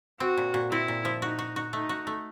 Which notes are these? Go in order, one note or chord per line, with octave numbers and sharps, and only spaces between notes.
C4 F#4
A#2
A#2
C4 E4
A#2
F3
D#4 F#4
F#4
F#4
A3 D#4
F#4
A3